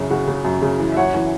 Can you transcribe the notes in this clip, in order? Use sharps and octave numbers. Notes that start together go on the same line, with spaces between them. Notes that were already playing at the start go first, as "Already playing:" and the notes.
Already playing: F#2 C#3 E3 F#4
C#3 F#4
C#3
F#2
C#3
E3
E5
F#2 C#5 F#5
E3